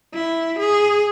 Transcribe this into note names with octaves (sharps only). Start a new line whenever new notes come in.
E4
G#4